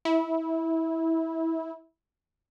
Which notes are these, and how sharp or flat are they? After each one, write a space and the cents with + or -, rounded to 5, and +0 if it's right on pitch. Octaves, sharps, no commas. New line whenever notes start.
E4 -20